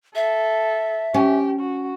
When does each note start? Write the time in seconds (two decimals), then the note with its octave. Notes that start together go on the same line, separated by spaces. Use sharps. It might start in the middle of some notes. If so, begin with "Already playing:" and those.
0.15 A4 E5
1.14 C#4 G4
1.60 F#4